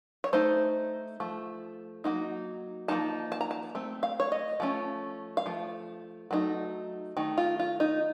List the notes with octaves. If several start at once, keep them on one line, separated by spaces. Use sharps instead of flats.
C#5
A3 D#4 C5
F3 A3
F#3 A#3 D#4
F3 A#3 D#4 A5
A5
A#5
A5
A3 C4
F5
C#5
D#5
F3 A3 C#4
F5
F3 A3
F#3 A3 D#4
D#3 A3
F4
F4
D#4